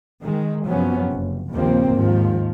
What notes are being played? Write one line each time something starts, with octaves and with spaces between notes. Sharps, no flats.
D#3 G#3
F#2 C3 F3 F#3 B3 C#4
F#1
A#1 D#2 C#3 F3 A#3 C4
D#2 G#2 D#3 F3